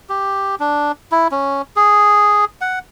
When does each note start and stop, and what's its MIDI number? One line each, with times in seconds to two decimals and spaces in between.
0.09 0.55 67
0.60 0.92 62
1.12 1.28 64
1.32 1.62 61
1.76 2.45 68
2.61 2.79 78